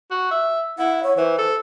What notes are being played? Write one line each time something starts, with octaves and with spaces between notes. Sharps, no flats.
F#4
E5
E4 F#5
C#5
E3 C5
A4